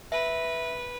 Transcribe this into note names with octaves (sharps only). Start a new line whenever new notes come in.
B4 E5